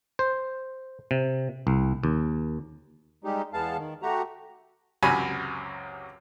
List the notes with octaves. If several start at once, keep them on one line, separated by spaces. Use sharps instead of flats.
C5
C3
C2
D#2
G3 G#3 D#4 G4
E2 G#3 B3 F5 A5
D#3
A3 F#4 G4 A#5
C#2 F#2 C3 G#5 B5